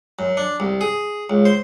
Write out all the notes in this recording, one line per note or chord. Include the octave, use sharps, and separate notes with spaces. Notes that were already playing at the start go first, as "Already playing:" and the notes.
F#2
D4
C2
G#4
C#2
C5